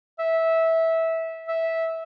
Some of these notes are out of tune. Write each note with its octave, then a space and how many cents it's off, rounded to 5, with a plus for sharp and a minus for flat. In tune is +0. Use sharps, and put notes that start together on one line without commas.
E5 -15
E5 -10